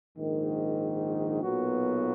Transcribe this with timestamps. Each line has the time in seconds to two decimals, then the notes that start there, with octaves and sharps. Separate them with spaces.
0.17 A#1 G#2 D#3
1.42 B1 A#2 F#3 B3 F#4